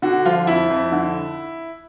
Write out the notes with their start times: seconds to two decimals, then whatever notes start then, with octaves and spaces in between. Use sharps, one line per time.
0.02 D3 F#4
0.25 F3 F4
0.47 F2 E4
0.70 F2
0.92 D3